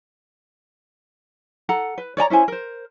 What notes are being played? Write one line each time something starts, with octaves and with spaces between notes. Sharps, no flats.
A4 F#5 A#5
B4
C#5 D5 G#5 A#5
C#4 E4 C5 G#5
A#4 C5